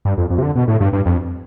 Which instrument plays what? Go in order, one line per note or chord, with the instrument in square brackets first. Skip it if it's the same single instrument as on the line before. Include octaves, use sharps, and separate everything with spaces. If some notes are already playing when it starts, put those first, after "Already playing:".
[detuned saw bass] G2
F2
F2
C3
D3
B2
A2
G2
G2
F2